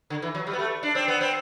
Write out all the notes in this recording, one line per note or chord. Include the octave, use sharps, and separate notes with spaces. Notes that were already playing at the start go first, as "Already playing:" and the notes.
D3
E3
F#3
G3
B3
A3
D4
C4
B3
C4